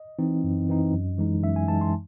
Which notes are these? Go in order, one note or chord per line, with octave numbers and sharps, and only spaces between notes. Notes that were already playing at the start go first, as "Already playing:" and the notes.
Already playing: D#5
E3 C4 D#4
F#2
E3 C4 D#4
F#2
E3 G#3 D#4
F#2 E5
G#5
E3 G#3 D#4 A5
C6